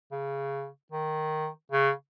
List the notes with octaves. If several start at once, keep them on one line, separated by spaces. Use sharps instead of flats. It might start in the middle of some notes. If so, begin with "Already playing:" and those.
C#3
D#3
C#3